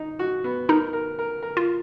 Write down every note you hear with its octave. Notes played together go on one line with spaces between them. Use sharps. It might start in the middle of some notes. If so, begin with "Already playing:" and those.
Already playing: D#4
F#4
B3
D#4 A#4
A#4
A#4
A#4
F4